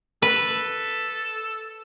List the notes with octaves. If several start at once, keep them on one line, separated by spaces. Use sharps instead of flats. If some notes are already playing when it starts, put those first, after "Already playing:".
A4 B4